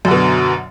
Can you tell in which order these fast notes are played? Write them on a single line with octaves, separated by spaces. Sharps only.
F#2 D3 B2